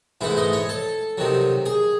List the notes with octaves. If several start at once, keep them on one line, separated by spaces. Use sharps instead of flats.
G#2 E3 A3 E4
D#5
C#5
A4
C3 D#3 F#3
G#4